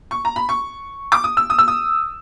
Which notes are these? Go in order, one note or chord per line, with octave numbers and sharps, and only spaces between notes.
C#6
A#5
B5
C#6
D6
D#6
E6
D#6
E6
D#6